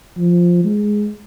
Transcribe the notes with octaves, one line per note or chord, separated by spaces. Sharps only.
F3
G#3